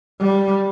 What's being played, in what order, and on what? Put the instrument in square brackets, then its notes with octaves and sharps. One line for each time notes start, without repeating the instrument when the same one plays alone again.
[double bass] G3